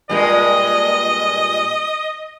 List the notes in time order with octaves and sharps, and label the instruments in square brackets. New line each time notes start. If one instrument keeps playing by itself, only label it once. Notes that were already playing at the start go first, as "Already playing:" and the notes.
[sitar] G2 A#2 G#3 [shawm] D#5